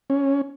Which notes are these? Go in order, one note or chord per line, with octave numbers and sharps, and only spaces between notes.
C#4